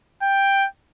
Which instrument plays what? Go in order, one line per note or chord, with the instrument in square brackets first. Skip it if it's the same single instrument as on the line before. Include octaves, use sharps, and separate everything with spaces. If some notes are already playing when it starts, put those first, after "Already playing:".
[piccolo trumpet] G5